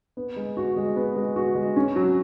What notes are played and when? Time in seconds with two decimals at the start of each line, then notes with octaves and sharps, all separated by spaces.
0.17 B3
0.36 G#3
0.57 F#4
0.77 G#3
0.96 B3
1.16 G#3
1.36 F#4
1.55 G#3
1.76 C#4
1.96 F#3